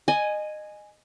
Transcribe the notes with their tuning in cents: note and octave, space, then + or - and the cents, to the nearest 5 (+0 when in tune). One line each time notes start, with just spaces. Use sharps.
D#5 -25 G#5 +0